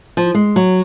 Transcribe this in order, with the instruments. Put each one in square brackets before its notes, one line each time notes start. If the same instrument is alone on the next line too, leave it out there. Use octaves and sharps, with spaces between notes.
[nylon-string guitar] F3
G#3
F#3